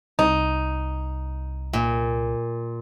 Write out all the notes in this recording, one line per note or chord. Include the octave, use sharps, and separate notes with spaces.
C2 D#4
A#2